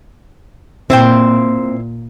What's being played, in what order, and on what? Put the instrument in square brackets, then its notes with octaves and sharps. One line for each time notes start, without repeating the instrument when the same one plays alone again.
[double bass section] A#2 [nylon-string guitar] C4 [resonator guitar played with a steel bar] E4 C5 G5